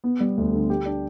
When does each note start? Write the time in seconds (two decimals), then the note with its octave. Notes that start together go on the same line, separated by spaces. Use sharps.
0.04 B3
0.20 G3
0.37 D2
0.53 D3
0.70 G4
0.86 D4